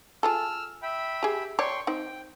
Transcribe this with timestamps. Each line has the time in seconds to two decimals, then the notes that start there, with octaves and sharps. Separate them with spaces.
0.23 F4 G#4 A4 E6 F6
0.83 E5 G5 B5
1.23 G4 G#4
1.59 C#5 D5 G5 C6 C#6
1.87 C4 D#4 G5